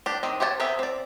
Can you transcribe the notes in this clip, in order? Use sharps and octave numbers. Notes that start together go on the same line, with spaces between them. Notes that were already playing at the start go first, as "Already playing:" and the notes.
D4 G4
D#3 C4 D#5
G4 C5 C#5 G5 A5
B3 C4 G4 G#4 E5
C4 D5